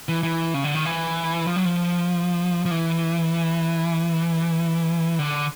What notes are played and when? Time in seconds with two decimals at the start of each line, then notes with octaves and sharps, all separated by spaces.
0.09 E3
0.23 E3
0.54 C#3
0.64 D3
0.75 D#3
0.85 E3
1.47 F3
1.56 F#3
1.65 F3
2.65 F3
2.71 E3
5.19 D3